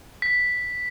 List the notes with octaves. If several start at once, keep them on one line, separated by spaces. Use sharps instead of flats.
B6